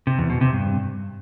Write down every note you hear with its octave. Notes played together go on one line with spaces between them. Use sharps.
C3
E2
B2
C3
G2